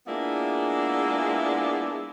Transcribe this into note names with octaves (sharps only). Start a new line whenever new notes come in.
G#3 A#3 B3 D4 E4 F4